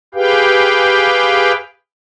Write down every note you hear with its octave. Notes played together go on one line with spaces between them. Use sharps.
G4 G#4 B4 F5 G5